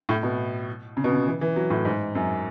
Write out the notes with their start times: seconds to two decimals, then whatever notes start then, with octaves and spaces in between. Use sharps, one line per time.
0.09 A2
0.23 B2
0.97 C#3
1.04 B2
1.12 C#3
1.27 E3
1.41 E3
1.56 F#3
1.70 A2
1.85 G#2
2.15 F#2